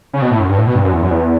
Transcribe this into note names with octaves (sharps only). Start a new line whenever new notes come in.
C#3
B2
A2
F#2
G2
A2
B2
G2
F#2
E2
F#2
E2